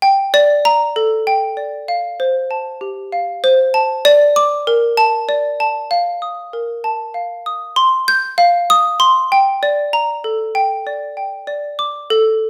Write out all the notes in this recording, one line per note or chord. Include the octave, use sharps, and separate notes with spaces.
G5
D5
A#5
A4
G5
D5
F5
C5
A5
G4
F5
C5
A5
D5
D6
A#4
A5
D5
A5
F5
D#6
A#4
A5
F5
D#6
C6
G6
F5
D#6
C6
G5
D5
A#5
A4
G5
D5
G5
D5
D6
A4